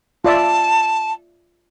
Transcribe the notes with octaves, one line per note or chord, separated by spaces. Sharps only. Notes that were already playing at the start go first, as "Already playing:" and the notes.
F4 D5 E5 A5